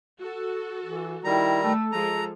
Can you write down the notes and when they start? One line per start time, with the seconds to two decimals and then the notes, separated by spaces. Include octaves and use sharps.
0.18 F#4 A4
0.84 E3
1.24 D#3 G3 E4 A#5
1.63 A3 A4
1.92 F3 G#3 A#5